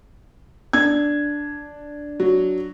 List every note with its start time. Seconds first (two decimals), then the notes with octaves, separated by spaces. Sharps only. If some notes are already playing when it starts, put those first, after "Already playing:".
0.73 D4 G#6
2.20 F#3